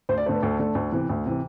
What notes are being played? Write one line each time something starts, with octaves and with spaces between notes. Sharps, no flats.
D2 C5
D5
D3 A3 C5
B4
D2 A4
D3 A3
D2
C3 E3
D2
C3 E3